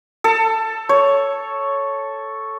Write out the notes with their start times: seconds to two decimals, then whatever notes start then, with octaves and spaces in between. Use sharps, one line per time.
0.24 A4
0.89 C#5